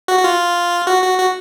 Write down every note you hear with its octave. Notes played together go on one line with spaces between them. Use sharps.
F#4
F#4
F4
F#4
F#4
F#4